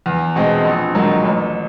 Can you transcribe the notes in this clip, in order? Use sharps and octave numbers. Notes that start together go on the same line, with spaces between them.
E2
B2 G#3 C4
A#1
G#2 D#3 F#3
A1